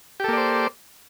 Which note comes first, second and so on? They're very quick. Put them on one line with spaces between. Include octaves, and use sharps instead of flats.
G4 A4 A#3 D5 C5